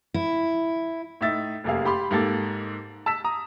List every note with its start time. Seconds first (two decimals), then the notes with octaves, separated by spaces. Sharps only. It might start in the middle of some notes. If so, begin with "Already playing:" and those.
0.14 E4
1.21 A2 D#4 E5 A6
1.64 F1 F#2 C3 A#3 G#4 F5
1.85 G4 B5 C6
2.11 G#2 A#3 G4 A4 A6
3.06 A5 E6 B6 E7
3.24 A#5 D#6